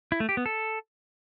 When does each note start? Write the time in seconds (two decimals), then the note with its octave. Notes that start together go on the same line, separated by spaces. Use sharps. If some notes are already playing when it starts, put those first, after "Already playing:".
0.12 E4
0.20 A3
0.29 G4
0.37 B3
0.46 A4